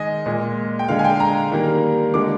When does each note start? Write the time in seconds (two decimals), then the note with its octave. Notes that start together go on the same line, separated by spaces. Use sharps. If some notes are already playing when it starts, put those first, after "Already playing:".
Already playing: D#3 G#3 D#5 G#5
0.26 A#2 G#3
0.79 G5
0.88 D3 G#3 F5
0.99 G#5
1.04 G5
1.20 A#5
1.52 D#3 G3 A#3
2.14 D3 G#3 D6